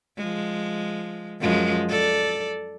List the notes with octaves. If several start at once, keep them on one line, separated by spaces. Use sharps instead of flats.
F3 G#3
F#2 F3 G#3
A4 D5